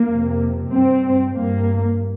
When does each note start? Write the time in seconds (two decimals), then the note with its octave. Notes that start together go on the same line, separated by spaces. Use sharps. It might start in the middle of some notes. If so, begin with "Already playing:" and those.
Already playing: A#3
0.09 F2 C3
0.73 G2 C4
1.37 G2 A#3